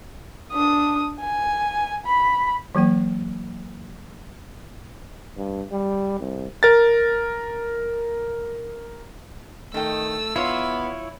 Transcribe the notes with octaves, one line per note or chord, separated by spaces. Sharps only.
D4 D#6
G#5
B5
E3 F#3 A#3 G5
G2
G3
C2
A#4 A6
D#3 A3 G5 E6
B3 E4 F4 C#5